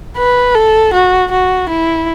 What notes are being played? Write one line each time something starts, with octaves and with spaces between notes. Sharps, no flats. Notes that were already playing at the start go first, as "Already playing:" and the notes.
B4
A4
F#4
F#4
E4